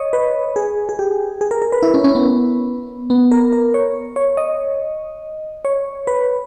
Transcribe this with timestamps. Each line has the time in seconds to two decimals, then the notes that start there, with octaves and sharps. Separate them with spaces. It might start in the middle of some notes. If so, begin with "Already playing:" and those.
Already playing: C#5 D#5
0.13 B4
0.56 G#4
0.89 G#4
0.99 G4
1.41 G#4
1.51 A#4
1.62 A#4
1.72 B4
1.83 E4
1.94 C#4
2.04 C#4
2.15 B3
3.10 B3
3.31 A#4
3.52 A#4
3.74 C#5
4.16 C#5
4.37 D#5
5.65 C#5
6.07 B4